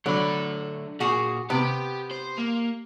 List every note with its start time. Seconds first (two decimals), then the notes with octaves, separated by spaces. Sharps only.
0.06 D3 F#3 A3 B5
1.00 A#2 F#4 G#4
1.50 C3 B3 G4
2.11 C5
2.38 A#3